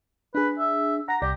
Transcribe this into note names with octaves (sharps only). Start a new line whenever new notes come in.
D4 G#4 B4
E5
F#5 A#5 A#6
C2 G4 D5 A#6